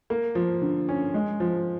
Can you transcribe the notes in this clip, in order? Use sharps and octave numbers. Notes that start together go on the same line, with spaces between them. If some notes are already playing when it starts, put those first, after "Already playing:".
A#3
F3
D3
C#4
G#3
F3